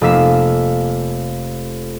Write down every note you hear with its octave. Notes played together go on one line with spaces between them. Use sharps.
F1 A#3 F5 E6 B6 E7